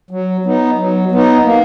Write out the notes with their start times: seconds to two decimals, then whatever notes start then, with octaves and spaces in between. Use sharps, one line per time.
0.11 F#3
0.45 B3 D#4
0.78 F#3
1.12 B3 D#4
1.44 A#3